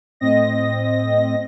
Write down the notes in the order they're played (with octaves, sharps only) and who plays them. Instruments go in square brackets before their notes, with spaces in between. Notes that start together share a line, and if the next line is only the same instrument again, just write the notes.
[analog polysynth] A2 C4 D#5 A#6